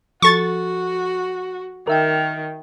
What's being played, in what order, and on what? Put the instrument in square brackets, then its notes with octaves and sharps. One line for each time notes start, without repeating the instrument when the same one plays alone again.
[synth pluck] F3 A4 [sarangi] F#4 [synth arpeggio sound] C#6 A6
[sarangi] D#3 [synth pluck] A#4 E5 G5